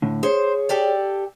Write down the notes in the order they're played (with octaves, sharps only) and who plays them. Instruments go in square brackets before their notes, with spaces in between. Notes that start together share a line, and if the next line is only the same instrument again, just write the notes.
[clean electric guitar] A2 D3
[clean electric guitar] G#4 C#5 [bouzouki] C5
[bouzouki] G4 A4 D5